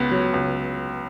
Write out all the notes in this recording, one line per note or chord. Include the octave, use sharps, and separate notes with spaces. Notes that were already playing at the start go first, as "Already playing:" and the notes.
Already playing: C#2 B3
F#3
C#2